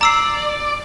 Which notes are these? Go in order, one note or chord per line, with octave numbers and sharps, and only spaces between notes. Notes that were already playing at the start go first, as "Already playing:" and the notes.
D5 A#5 E6 C7